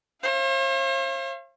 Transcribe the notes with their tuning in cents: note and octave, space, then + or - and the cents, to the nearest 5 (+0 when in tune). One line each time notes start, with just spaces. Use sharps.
C5 +45 F5 -35